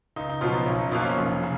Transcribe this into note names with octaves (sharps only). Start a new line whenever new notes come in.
C#2 D#4
D#4
B2 F3 F#3 B3 F4
D#4
B1 C#4
D#4
B2 F3 F#3 A#3 F4
C#4
F1
C#3